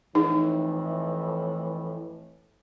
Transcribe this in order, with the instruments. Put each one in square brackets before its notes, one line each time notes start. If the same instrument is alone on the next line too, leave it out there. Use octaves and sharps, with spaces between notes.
[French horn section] F2 A2 E3 [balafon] D#4